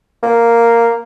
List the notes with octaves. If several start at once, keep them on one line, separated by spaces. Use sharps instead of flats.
A#3